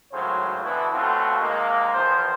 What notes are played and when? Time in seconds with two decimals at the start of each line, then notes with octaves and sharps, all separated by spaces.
0.12 G#1 A2 C#3 F#3 C5
0.63 B2 D3 E3 B3 E4
0.93 B2 A3 C4 C#4 F4 F#4
1.41 C3 D#3 G#3 A#3
1.94 E2 D#3 F3 C5